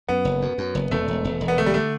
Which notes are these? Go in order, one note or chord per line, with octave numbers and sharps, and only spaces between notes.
F#2 B3
F#1
F#2
F#2
F#1
E1 A3
E1
E1
E1
B3
D3 A3
G3
D3 A3